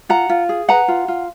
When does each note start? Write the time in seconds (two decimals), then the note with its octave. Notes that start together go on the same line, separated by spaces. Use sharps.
0.09 F4 F#5 A#5
0.29 F4
0.49 G#4
0.68 B4 F#5 A#5
0.88 F4
1.08 F4